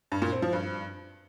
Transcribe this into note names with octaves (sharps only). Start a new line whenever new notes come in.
G2
A#2
C4
F3
G2